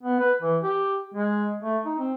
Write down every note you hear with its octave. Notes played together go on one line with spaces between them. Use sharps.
B3
B4
E3
G4
G#3
A3
D#4
C4